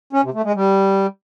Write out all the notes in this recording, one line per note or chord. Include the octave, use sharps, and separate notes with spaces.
C#4
C3
A3
G#3
G3